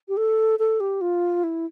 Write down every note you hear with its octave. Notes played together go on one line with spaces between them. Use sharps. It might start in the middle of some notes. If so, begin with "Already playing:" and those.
G4
A4
A4
G4
F4
E4